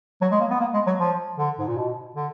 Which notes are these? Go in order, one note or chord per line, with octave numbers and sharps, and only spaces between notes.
F#3
G#3
A#3
B3
A#3
G#3
F#3
F3
D3
G#2
A#2
B2
D3